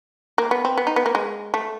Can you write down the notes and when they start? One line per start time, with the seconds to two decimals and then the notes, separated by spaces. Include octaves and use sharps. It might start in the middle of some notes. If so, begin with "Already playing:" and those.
0.38 A#3
0.51 B3
0.65 C4
0.77 B3
0.87 D#4
0.96 B3
1.06 A#3
1.15 G#3
1.54 A3